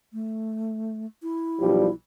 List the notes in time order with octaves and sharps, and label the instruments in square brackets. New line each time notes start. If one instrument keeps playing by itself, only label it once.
[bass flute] A3
E4
[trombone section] B1 F3 G3